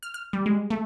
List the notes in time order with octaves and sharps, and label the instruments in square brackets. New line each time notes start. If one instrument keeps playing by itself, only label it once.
[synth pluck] F6
F6
G3
G#3
A3